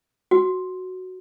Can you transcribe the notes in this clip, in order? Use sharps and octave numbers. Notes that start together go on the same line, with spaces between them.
F#4